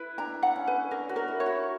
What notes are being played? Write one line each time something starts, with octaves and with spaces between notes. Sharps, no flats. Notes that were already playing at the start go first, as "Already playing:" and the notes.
Already playing: E4 B4
D4 A#5
F#5
C#4
B4
D4 A#4
F#4
A#4
E4
C#5
F#4